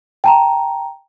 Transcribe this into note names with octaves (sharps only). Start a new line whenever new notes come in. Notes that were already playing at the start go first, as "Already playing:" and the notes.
G5 A5 A#5